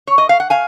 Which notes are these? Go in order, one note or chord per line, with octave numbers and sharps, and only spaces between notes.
C#5
D#5
F5
F#5
F5 G#5